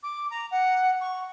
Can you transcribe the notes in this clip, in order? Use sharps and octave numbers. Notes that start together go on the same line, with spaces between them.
D6
A#5
F#5
C#6